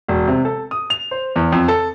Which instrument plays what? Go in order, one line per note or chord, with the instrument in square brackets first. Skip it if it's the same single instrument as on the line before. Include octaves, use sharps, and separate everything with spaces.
[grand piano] E1
C3
A4
D#6
F7
C5
E2
F2
A4